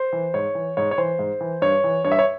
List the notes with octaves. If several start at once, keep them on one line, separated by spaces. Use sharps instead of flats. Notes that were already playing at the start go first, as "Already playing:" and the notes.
Already playing: C5
E3
G#2 C#5
E3
G#2 C#5
C#5
E3 C5
G#2
E3
G2 C#5
E3
G2 C#5
E5
C#5